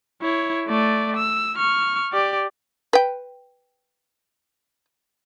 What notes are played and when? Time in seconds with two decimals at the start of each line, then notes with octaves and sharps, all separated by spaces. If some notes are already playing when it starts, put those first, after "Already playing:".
0.22 E4 C#5
0.68 A3 D5
1.17 E6
1.57 C#6 F6
2.13 G4 D5
2.93 B4 G5